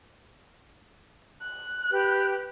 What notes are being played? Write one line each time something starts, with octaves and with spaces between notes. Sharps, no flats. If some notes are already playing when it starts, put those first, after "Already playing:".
F#6
G4 B4